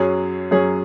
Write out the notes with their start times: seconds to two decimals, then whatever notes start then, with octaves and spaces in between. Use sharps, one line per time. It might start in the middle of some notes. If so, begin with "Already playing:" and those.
Already playing: F#2 F#3 C#4 G#4
0.51 F#2 F#3 C#4 G#4